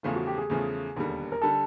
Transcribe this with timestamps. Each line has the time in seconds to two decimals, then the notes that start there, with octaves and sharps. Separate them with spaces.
0.03 E2 C#3 F3 A3 F4
0.16 F#4
0.27 G4
0.38 G#4
0.50 E2 C#3 F3 A3
0.96 E1 D#2 D3 G3
1.32 A#4
1.42 D3 G3 A4